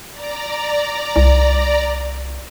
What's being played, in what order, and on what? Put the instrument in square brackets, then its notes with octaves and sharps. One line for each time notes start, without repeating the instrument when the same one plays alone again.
[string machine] D5 A#5
[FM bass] C2